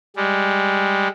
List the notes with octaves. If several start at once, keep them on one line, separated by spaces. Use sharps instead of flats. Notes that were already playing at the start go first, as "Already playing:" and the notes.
G3 G#3